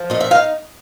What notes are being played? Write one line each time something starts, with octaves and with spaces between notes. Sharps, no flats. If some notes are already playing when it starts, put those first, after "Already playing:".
Already playing: F3
A#2 D#5
E5
D#4 F5